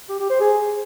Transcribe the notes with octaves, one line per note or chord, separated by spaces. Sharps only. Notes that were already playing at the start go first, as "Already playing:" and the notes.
G4
G4
C5
G#4